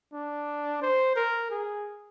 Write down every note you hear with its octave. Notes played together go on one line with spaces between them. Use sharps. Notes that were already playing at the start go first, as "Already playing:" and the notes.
D4
C5
A#4
G#4